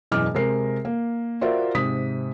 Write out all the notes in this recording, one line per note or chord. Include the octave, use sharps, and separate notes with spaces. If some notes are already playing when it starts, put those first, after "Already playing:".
E1 F#2 E3 D#5 D6 F6
C3 G#3 A#4 C7
A#3
F4 F#4 A#4 C5 D5 E5
G#2 C3 D#6 B6